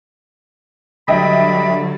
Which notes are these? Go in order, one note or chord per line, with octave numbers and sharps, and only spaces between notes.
D3 F#3 G3 D#5 E5 G5 B5